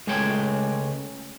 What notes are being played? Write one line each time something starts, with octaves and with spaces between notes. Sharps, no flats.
C#2 G#3 A3 C#5 G5 G#5